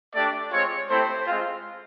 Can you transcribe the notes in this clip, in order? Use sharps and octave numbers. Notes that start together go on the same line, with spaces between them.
A3 D4 G4 D5
G#3 C4 F4 C#5
A3 C4 E4 G4 C5
G#3 C4 F4